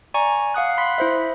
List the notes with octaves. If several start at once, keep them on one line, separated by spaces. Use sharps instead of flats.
D5 G#5 A#5 C#6
F5 F#5 D#6 F#6
B5 C6 F#6 B6
E4 C5 E5